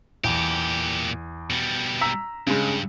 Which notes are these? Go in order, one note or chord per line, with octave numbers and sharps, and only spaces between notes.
E2 A#2 G4
B2 G3
A#5 E6 B6
G2 C#3 G#3